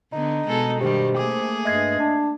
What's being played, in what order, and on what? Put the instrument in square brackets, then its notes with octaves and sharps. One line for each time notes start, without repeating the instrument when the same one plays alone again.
[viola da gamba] D3 B3 [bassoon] D#4
[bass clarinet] B2 [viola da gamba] G#3 B3 A4
[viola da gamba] G2 D#3 G3 [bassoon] C3 [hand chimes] G4
[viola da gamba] A3 A#3 G#4 [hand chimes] D6
[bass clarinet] G2 [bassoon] G#3 [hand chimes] E5 G#6 C7
[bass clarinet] D4